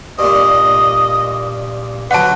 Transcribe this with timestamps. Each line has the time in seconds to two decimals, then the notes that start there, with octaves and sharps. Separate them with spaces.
0.19 G2 A#2 D#5
2.11 D3 F#3 B4 F#5 A5